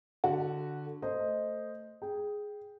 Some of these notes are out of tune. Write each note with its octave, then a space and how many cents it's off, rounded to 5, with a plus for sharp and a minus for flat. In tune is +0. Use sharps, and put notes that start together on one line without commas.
D3 +0 F#4 +0
A3 +20 C5 +0 D#5 +0
G#4 +0 G5 +0